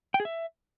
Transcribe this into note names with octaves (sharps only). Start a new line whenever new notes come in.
G5
G#4
E5